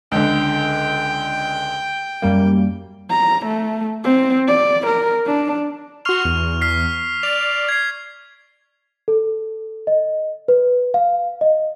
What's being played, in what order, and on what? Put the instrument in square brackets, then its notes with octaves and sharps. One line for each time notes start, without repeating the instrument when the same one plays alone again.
[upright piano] C#2 D3 [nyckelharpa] G5
[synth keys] F#2 G3 A#3
[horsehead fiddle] A#5
A3
C4
D5
A#4
D4
[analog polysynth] F#4 C6 [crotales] C#6 F6 F7
[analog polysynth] E2
[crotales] F6 B6 C7
[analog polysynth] D5 [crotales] F7
[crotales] G#6 C7
[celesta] A4
D#5
B4
F5
D#5